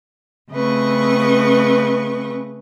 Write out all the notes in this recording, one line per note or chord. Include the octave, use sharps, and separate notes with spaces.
C#3 A3 C4 B4 D#5 C#6